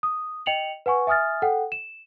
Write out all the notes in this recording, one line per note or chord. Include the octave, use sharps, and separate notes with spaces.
D#6
D#5 G5 C#7 F7 F#7
B4 F#5 G#5 C#6
E5 G#5 D#6 F6 A6
A4 F#5 G5
E7